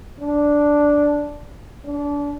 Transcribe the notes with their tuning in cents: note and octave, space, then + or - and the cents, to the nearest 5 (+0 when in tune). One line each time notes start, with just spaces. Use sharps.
D4 -5
D4 -30